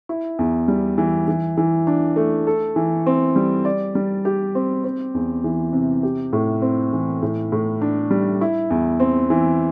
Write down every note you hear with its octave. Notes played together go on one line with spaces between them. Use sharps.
E4
E2
G3
E3
E3
E3
D4
A3
A4
E3
C4
G3
D5
G3
G4
C4
C4
E2
E3
C3
G4
A2
C4
E3
A2
A2
D4
G3
E4
E2
C4
E3